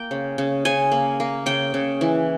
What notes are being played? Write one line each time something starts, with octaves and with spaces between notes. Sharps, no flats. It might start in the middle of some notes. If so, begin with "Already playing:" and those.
Already playing: A#3 G5
C#3
C#3
C#3 G#5
A#3
A#3
C#3 G5
C#3
E3